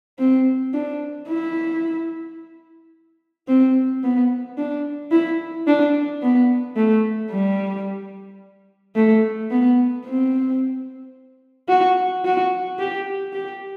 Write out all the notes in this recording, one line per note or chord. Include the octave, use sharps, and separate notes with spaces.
C4
D4
E4
C4
B3
D4
E4
D4
B3
A3
G3
A3
B3
C4
F#4
F#4
G4
G4